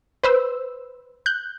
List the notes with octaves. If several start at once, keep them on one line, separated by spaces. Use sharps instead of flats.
B4 C5 E6
F#6 G6